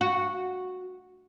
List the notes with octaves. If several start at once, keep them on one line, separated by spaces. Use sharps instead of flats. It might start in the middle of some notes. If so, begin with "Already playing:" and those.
F#4